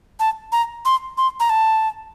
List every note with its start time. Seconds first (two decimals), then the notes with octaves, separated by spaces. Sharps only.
0.20 A5
0.52 A#5
0.85 C6
1.18 C6
1.40 A#5
1.50 A5